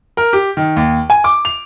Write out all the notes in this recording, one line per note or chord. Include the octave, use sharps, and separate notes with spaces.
A#4
G4
D#3
D#2
G#5
D6
F7